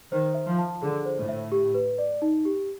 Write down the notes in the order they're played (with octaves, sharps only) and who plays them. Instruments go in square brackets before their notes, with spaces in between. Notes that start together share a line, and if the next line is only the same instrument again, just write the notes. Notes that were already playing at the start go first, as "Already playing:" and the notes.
[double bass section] D#3 [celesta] C5
[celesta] E5
[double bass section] F3
[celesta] A5
[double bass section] D3 [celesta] G#4
[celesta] C5
[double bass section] A2
[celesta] E5
G4
B4
D5
D#4
G4